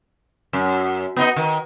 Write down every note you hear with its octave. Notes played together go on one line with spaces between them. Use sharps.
F#2
B3 D#4 D#5
D#3